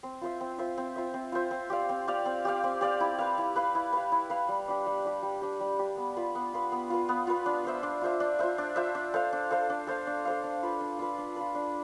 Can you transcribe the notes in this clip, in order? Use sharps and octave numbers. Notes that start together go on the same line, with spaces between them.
C4
F4 C5 E5
C4
F4 C5 E5
C4
F4 C5 E5
C4
F4 C5 E5
C4
G4 D5 F5
C4
G4 D5 F5
C4
G4 D5 F5
C4
G4 D5 F5
E4
B4 F5
E4
B4 F5
E4
B4 F5
E4
B4 F5
G3
D4 G4
G3
D4 G4
G3
D4 G4
G3
D4 G4
B3
F4 B4
B3
F4 B4
B3
F4 B4
B3
F4 B4
D4
F4 C5 E5
D4
F4 C5 E5
D4
F4 C5 E5
D4
F4 C5 E5
D4
A4 C5 F5
D4
A4 C5 F5
D4
A4 C5 F5
D4
A4 C5 F5
D4
F4 B4
D4
F4 B4
D4
F4 B4
D4